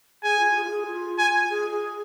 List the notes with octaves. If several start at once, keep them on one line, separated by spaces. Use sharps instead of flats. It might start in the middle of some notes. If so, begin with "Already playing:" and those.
G#4 G#5
F4
G#4
F4
G#4
F4
G#5
G#4
G#4